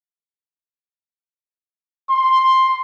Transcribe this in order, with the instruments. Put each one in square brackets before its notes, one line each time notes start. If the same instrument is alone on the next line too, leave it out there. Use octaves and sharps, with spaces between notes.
[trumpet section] C6